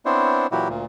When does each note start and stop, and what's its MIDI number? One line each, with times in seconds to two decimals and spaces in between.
0.06 0.47 59
0.06 0.47 60
0.06 0.47 62
0.06 0.47 64
0.06 0.47 72
0.06 0.47 73
0.52 0.68 46
0.52 0.68 52
0.52 0.68 54
0.52 0.68 64
0.52 0.68 66
0.52 0.68 67
0.69 0.85 38
0.69 0.85 46